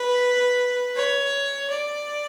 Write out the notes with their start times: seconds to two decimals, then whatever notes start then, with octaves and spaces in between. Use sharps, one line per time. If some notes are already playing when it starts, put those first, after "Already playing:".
Already playing: B4
0.96 C#5
1.70 D5